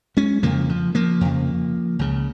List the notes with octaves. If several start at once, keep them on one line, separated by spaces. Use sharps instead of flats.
G#3 C#4
F2 C#3 F3 A#3
F3
F3 A#3
F2 C#3
C#2 C#3